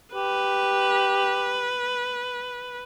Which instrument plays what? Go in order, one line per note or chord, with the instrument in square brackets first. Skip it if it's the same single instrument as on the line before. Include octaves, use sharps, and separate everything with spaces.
[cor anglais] G4 [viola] B4